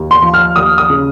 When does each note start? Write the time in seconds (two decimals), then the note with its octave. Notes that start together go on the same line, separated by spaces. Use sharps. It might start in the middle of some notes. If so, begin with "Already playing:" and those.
Already playing: D#2
0.11 C6
0.22 F3
0.34 F6
0.56 D#2 D#6
0.78 D#6
0.90 C#3